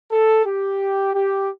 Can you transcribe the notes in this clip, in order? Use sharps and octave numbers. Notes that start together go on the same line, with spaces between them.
A4
G4
G4